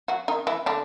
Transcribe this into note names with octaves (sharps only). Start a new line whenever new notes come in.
F#3 F#4
D#3 D#4
E3 E4
D3 D4